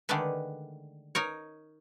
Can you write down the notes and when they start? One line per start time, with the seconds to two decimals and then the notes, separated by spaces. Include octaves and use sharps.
0.09 D3 D#3 G#3 A3 D4 B4
1.15 D#4 A#4 C#5